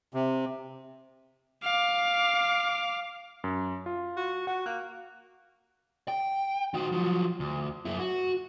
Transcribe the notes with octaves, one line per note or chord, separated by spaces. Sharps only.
C3
F5 D6
F#2
F4
F#4
F#4 F#5
A#3 F#6
G5
D#3 F#4
F3 F#3
D2
F#2 E4
F#4